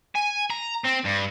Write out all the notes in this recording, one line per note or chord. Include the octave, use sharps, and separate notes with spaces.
G#5
A#5
C4
G2